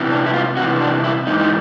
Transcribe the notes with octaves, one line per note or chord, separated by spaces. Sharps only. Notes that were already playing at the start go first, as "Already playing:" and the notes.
Already playing: E2 C3 E3
D4
E4
F4
E2 C3 E3 F#4
D4
E4
G#2 E3 D#4
D#4